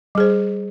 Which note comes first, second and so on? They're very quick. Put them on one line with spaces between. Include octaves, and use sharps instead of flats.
G3 G#4 C5